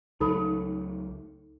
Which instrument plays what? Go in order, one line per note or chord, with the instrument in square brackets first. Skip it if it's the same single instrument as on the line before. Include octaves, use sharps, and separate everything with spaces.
[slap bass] C#2 F#3 A3 [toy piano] D#4 A4 B5